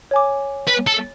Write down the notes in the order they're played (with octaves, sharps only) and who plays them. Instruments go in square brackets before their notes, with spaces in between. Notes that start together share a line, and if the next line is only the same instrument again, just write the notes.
[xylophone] C#5 G#5 D6
[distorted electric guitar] B4
A4